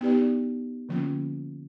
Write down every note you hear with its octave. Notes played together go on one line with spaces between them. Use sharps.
B3 D#4 G4 B4 D5
D3 F3 A#3 C#4 F4